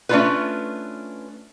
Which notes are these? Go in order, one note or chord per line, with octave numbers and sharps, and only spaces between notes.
A3 C#4 D4 E4 F4 B4